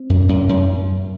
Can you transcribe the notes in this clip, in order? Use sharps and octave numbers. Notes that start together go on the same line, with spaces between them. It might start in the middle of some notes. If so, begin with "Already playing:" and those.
Already playing: C4
F#2
F#2
F#2